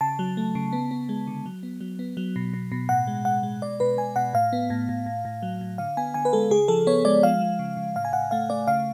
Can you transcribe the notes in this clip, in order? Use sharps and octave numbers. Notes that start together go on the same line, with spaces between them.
C#3 A5
F#3
A3
C#3
B3
B3
G#3
D3
F#3
B3
F#3
B3
F#3
B2
B2
B2
A2 F#5
G#3
G#3 F#5
G#3
B2 D5
B2 B4
B2 G#5
B2 F#5
A2 F5
B3
A2
A2
A2
A2
F#3
A2
D3 F5
B3 G#5
D3 G#5
B4
G#3 A4
C#3 G#4
F3 A4
B3 C#5
G#3 D5
F3 F5
F3
C#3
C#3
A2 F5
G#5
A2 F#5
A3 F5
A3 D5
C#3 F5